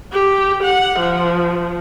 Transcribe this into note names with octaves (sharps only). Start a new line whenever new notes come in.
G4
F#5
F3